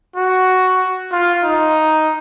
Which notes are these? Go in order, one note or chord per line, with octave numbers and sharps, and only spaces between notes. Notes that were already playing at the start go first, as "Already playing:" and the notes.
F#4
F4
D#4